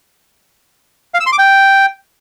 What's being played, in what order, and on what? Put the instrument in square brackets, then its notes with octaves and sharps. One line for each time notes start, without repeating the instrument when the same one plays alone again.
[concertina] F5
E6
C6
D6
G5